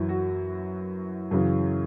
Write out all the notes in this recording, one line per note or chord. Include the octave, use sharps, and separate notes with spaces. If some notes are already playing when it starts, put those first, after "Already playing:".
Already playing: F#2 E3 E4
F#4
F#2 C#3 E3